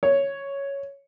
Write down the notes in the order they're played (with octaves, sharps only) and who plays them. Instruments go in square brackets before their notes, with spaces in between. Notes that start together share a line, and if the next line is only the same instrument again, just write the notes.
[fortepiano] C#5